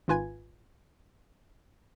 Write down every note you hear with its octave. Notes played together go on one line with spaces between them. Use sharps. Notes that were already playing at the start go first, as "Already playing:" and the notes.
G#1 G#2 F4 B4 G#5 G#6